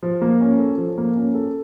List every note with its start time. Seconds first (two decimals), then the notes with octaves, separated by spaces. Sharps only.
0.03 F3
0.22 A#3
0.41 C#4
0.59 A4
0.78 F3
0.98 A#3
1.16 C#4
1.34 A4